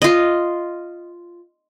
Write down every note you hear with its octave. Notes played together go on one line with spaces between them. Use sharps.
F4 D#5